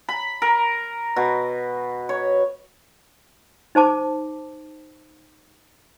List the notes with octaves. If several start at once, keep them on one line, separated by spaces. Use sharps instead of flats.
B5
A#4
B2
C#5
D#4 C5 A5 D6